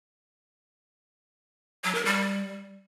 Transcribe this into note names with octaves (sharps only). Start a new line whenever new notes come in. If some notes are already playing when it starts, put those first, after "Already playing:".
F#3
A#4
G3